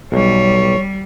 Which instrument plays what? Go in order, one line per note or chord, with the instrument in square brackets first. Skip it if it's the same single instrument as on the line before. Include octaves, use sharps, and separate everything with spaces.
[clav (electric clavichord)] B1 [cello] G3 [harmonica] C#5